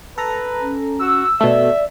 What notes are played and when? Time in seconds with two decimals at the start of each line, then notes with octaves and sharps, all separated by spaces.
0.18 A4 B4 A#5
0.61 C#4
0.99 F#4 E6
1.41 B2 A3 D5 E5